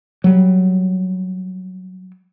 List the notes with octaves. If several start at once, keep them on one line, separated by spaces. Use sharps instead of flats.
F#3 G3